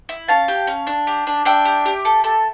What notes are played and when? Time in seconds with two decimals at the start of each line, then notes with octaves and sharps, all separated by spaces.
0.09 E4
0.28 C#4 F5 A5
0.48 G4
0.67 C#4
0.87 D4
1.07 G4
1.27 D4
1.45 D4 E5 G5
1.65 G4
1.86 G4
2.05 A4
2.24 A4